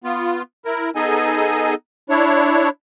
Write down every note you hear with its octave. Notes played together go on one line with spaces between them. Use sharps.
B3 F4
E4 A#4
B3 D#4 G#4 A4 D#5 G#5
D4 E4 C#5